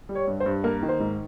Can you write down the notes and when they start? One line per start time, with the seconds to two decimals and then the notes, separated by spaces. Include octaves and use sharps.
0.09 G3
0.15 C#5
0.28 G2
0.40 C5
0.46 G2
0.64 A#3 A#4
0.83 D#3
0.89 C5
1.00 G#2